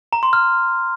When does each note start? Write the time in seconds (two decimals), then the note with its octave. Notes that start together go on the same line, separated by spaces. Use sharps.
0.13 A#5
0.23 C6
0.33 F6